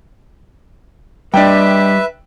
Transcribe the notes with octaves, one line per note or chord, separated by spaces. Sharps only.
G3 D4 B4 D#5 E5 G5